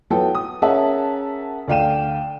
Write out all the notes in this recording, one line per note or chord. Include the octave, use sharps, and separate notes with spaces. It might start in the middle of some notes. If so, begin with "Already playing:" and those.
F#3 B3 E4 A4 G5
D#6
C#4 G#4 A#4 E5 F#5 A5
D2 D5 F5 G5 D#7 E7